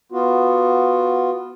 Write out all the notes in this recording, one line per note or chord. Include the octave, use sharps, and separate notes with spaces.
B3 F4 F#4